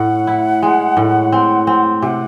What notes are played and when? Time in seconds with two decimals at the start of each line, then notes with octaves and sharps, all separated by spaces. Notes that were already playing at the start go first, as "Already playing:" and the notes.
Already playing: A2 F#5
0.27 E4
0.63 G#3
0.97 A2
1.32 C4
1.67 C4
2.02 C3 F#5